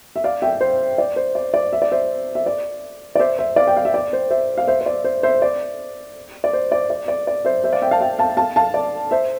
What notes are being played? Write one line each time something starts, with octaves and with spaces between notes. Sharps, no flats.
E5
D5 F5
E5 G5
C5
D5
C5
D5
D5
E5
D5
C5 E5
E5
D5
D5
C5 E5
C5 E5
D5 F5
G5
F5
E5
D5
C5
C5 E5
F5
C5 E5
C5
D5
C5
C5 E5
D5
D5
C5
D5
D5
D5
D5
C5 E5
C5 E5
D5 F5
E5 G5
F5 A5
E5 G5
F5 A5
F5 A5
F5 A5
D5
C5 E5